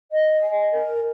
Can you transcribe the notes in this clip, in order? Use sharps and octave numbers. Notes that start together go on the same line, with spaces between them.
D#5
G#5
A#4